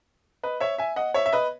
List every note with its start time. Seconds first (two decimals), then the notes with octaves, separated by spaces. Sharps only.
0.43 B4 D#5
0.60 C#5 E5
0.78 E5 G#5
0.96 D#5 F#5
1.14 C#5 E5
1.26 E5
1.33 B4 D#5